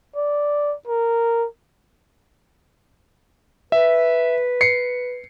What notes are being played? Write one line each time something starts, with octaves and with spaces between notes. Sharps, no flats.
D5
A#4
B4 E5
C7 C#7